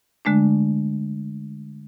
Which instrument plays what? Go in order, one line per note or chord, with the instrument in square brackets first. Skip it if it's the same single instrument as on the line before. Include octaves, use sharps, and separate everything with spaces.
[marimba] D3 G#3 A3 D4